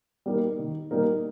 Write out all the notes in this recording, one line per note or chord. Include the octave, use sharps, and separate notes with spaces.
G3 A#3 D#4 A#4
D#3
G3 A#3 D#4 A#4